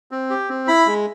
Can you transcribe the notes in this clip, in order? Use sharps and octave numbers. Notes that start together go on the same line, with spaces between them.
C4
G4
C4
E4 B5
G#3